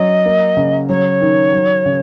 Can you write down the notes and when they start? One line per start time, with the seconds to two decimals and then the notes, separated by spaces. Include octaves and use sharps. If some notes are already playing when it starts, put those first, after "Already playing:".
Already playing: F#3 C#4 D#5
0.26 A#3
0.57 C#3
0.89 F#3 C#5
1.21 D#3
1.53 F#3
1.86 C#3